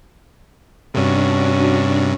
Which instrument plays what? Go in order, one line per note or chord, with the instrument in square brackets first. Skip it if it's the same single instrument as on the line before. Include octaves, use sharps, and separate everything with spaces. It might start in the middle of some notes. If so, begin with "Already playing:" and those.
[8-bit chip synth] G2 C3 [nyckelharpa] C#4 [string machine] D4 F#4